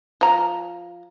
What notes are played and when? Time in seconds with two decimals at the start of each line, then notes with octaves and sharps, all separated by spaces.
0.21 F3 A#5